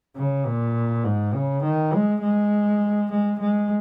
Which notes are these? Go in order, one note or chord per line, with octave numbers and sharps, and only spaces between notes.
C#3
A#2
G#2
C#3
D#3
G#3
G#3
G#3
G#3